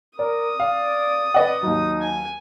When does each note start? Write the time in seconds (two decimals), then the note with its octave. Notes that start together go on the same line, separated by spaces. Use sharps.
0.19 A#4 D5 D#6
0.60 D5 F5
1.34 B4 D5 D#5 F#5
1.63 D#2 F#3 D#4
2.01 G#5